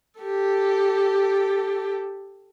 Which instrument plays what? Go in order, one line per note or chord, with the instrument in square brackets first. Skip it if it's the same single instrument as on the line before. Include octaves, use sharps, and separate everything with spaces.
[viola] G4 A4